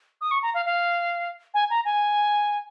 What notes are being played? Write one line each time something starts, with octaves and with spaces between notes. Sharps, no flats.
D#6
C#6
A#5
F5
F5
G#5
A#5
G#5